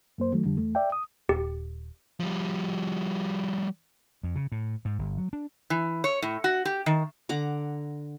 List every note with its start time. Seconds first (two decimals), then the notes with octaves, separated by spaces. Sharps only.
0.18 F#2 A#3 C5
0.33 D#3 F#3 A3
0.45 F2 D3 G3
0.57 E2 A3
0.75 D5 E5 G5
0.92 D#6
1.29 D#1 G4
2.20 F3 G3
4.23 F2
4.36 C#3
4.52 A2
4.85 G#2
4.99 G1
5.18 F#3
5.33 D4
5.70 E3
6.04 C#5
6.22 A2
6.44 F#4
6.65 G4
6.86 D#3
7.29 D3 F#5 A#5 D6